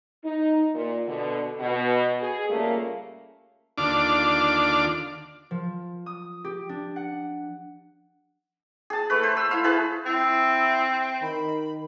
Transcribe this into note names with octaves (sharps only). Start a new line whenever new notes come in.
D#4
A#2
B2 D3
B2
G#4
A#2 C#3 G3 A3 A#3
D#2 D3 D4 F4 D6
F3
D#6
G4
D4
F#5
G#4 A5
A3 B4
C5
E6
E4 F5
G#4 B4 A5
C4 E4 E6
D#3 B5